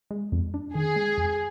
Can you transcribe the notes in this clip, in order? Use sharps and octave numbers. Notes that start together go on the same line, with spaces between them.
G#3
F2
D4
D#3 G#4
G#3
F2